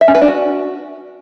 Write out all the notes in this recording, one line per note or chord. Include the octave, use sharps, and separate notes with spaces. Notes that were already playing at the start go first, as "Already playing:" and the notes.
E5
C#4
B4
D4
F#4